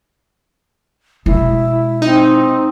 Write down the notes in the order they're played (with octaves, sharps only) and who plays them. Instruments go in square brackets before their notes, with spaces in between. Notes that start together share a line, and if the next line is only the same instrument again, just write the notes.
[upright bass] B2 G#3 [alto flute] E4
[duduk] C4 [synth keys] D#4